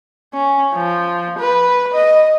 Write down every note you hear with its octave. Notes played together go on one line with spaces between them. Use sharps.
C#4
F3
B4
D#5